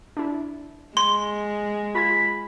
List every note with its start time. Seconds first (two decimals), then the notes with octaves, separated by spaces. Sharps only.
0.17 D4 E4
0.97 G#3 C6
1.95 F4 B5 G#6